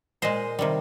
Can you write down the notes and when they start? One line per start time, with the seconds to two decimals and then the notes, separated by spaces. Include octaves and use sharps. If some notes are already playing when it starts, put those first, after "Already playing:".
0.22 A#2 G#3 C5 D#5
0.59 C3 D#3 G3